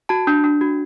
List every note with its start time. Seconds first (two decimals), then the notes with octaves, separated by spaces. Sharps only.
0.09 F#4 A5
0.27 D4
0.44 D4
0.61 F#4